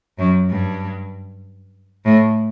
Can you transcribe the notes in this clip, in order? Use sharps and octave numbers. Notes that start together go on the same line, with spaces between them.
F#2
G2
A2